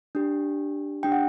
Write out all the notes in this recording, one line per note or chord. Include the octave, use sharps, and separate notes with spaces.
D4 G4
D4 G4 G5
F#5